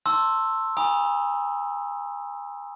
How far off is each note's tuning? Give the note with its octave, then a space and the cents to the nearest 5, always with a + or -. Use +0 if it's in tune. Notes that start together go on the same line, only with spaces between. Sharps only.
A5 +25 C6 +15 E6 +0
G#5 -35 B5 -40 D#6 +0